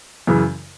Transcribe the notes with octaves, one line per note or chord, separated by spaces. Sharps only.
F#2 C#3 E3